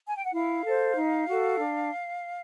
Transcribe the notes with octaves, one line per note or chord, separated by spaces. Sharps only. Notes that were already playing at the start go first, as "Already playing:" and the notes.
G#5
G5
F#5
E4 F5
A4 C5
D#4
F#4 A4
D4